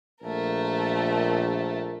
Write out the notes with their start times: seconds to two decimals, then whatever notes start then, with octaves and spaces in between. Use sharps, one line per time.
0.22 A#1 A3 A#4